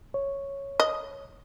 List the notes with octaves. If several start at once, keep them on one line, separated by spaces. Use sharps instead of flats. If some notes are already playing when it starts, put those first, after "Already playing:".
C#5
D#5